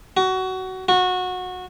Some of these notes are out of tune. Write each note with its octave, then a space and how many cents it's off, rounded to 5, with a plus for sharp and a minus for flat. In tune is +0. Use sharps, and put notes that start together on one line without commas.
F#4 +20
F#4 -20